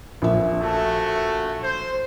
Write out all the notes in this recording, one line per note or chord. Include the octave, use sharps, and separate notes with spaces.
A#1 E5
A3 F#4 A4
C5